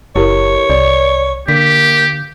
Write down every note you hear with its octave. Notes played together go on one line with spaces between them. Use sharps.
F#1 E4 G4 A#4 C#5
C2 D5
D3 A#3 G4 B6